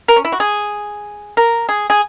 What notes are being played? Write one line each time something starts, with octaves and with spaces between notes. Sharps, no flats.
A#4
C#4
E4
F#4
G#4
A#4
G#4
G#4